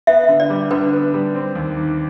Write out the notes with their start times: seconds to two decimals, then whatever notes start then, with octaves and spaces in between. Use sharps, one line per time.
0.07 B3 E5
0.28 D3
0.40 D5
0.50 G3
0.71 D3 B4
0.93 B3
1.14 G3
1.35 C4
1.55 D#2
1.77 D#3